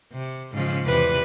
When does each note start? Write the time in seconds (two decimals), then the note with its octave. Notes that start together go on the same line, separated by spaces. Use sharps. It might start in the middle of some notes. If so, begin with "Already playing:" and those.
0.12 C3
0.53 G#2 C#3 F3
0.84 E2 C3 B4